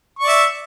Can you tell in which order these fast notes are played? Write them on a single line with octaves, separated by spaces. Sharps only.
C#6 D5 E5